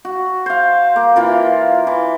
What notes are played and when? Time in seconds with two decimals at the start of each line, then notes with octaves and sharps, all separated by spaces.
0.05 F#4
0.46 C5 F5
0.96 A#3
1.16 E3 F4 A#4
1.87 E3